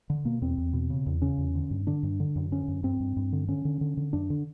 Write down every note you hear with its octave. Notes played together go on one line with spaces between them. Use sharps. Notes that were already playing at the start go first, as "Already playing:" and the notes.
D3
B2 A#3
E2 C4
E2
B2
C#3
E2
C#3 C#4
E2
D3
G2
D3 D4
G2
D3
F#2
D3 C#4
F#2
G2 C4
G2
G2
D3
D3 C#4
D3
D3
D3
F#2 D4
D3